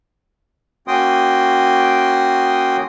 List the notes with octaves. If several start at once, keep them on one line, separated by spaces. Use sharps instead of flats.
A#3 C#4 F#4 G5 C6 D#6